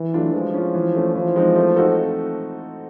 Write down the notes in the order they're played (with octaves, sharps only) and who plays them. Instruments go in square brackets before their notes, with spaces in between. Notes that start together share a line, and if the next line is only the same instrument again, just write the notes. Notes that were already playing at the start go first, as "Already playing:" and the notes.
Already playing: [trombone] E3
[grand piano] F#3 A3 D4 F4
[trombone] F3 [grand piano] G#3
[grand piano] C#4 F4
E3
A3 C#4
[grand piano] E3 [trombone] F3
[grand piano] G#3 C4 D#4
A3
C4 D#4 F#4 A4